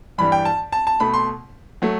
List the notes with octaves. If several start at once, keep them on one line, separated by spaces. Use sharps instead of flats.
G2 E3 G3 B5
G5
A5
A5
A5
B2 A3 B5
C6
F#3 A3